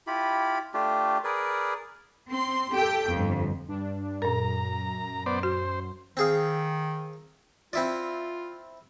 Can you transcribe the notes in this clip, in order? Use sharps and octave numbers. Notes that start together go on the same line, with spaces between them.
E4 F4 G4 B5
A3 D4 F4 G4
G#4 A#4 B4 D5
C4 C6
G4 A4 G5
G1 F2
G2 D4
F#2 A#2 A#4 A#5
B3 C5 D5
F#4 C5
D#3 C4 G#4 F5
C4 E4 F4 D5